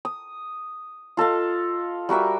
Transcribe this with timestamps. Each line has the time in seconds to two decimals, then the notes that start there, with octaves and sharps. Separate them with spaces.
0.05 D#6
1.17 F4 A4 D#5 F5
2.09 G3 F#4 A#4 E5